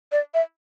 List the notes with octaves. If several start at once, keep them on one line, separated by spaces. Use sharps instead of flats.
D5
E5